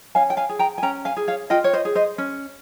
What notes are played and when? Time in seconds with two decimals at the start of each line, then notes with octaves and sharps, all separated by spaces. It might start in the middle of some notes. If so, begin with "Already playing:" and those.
0.15 C#4 F5 G#5
0.30 G5
0.37 F5 G#5
0.49 G#4
0.59 G5 A#5
0.78 G#5
0.83 C#4 G5 A#5
1.05 F5 G#5
1.17 G#4
1.28 C#5 F5
1.50 F4 D#5 G5
1.64 C#5
1.73 C5 D#5
1.85 G#4
1.95 C5 D#5
2.18 C#4